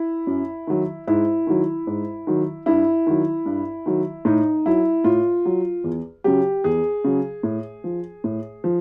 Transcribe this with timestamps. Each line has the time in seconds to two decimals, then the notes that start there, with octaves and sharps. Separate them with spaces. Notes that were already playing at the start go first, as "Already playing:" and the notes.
Already playing: E4
0.27 F#2
0.67 D#3 F#3
1.07 G#2 E4
1.47 D#3 F#3
1.87 G#2
2.27 D#3 F#3
2.66 G2 E4
3.07 D#3 F#3
3.46 G2
3.86 D#3 F#3
4.25 A2 D#4
4.66 F#3 E4
5.04 A2 F4
5.45 F#3
5.84 E2
6.24 C#3 F#3 G4
6.64 E2 G#4
7.04 C#3 F#3
7.43 A2
7.84 F3
8.24 A2
8.64 F3